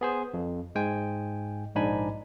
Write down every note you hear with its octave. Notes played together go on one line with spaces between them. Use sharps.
B3 G#4 C5
F2
G#2 G#3 G5 G#5
A#1 G#2 D4 D#4 G#5 B5